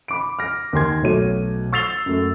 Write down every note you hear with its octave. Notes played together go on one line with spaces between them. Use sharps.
B5 D6 D7
F6 A#6
D#2 G#5 C6 G#6
B1 B2 F#3 A3 C#5 D#7
C#6 E6 A6 C7 F7 G7
F#2 A3